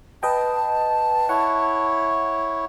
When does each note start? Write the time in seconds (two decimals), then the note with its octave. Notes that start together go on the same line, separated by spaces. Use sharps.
0.23 B4 D#5 G5 A5
1.29 E4 C#5 F#5